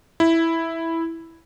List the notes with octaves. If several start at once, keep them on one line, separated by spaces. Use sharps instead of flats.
E4